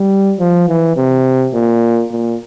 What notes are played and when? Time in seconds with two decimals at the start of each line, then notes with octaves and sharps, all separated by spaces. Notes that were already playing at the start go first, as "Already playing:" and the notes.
Already playing: G3
0.39 F3
0.68 E3
0.96 C3
1.54 A#2
2.12 A#2